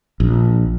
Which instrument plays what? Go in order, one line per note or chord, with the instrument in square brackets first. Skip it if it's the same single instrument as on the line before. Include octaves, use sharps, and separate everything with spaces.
[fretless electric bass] A#1